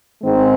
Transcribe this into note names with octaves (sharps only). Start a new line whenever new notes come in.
G#2 D#3 G#3 C4